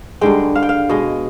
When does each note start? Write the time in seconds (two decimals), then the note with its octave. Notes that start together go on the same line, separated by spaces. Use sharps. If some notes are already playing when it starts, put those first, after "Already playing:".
0.21 G2 D3 G#3 G5
0.56 F5
0.63 G5
0.69 F5
0.89 B2 G#3 D#5